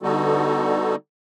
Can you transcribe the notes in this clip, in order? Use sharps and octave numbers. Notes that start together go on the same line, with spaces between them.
D3 G3 B3 D#4 F#4 A4